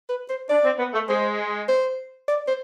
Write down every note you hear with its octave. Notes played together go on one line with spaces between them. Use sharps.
B4
C5
D4 D5
C4
B3
A3
G#3 C5
C5
D5
C5